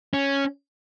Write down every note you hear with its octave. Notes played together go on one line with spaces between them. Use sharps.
C#4